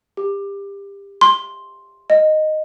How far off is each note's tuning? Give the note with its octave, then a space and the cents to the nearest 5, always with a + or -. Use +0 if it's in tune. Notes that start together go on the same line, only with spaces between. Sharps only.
G4 +25
C6 +5
D#5 -5